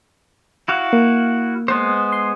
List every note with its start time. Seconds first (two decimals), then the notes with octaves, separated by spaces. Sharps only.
0.68 E4 F#4 F5
0.93 A#3
1.68 G#3 B3 C5
2.12 C6